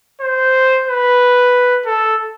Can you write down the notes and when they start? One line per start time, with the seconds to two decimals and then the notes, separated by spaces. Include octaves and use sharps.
0.21 C5
0.88 B4
1.86 A4